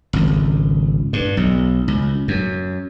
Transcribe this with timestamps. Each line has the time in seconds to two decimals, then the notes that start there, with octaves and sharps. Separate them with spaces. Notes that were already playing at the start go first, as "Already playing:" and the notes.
0.13 G#1 C#2
1.13 G2
1.37 B1
1.88 C#2
2.28 F#2